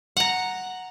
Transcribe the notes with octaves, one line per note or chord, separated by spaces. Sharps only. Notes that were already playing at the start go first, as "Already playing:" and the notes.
F#5 A#5